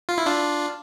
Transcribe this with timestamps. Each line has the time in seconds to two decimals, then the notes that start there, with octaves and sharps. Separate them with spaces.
0.09 F4
0.18 E4
0.26 D4 F4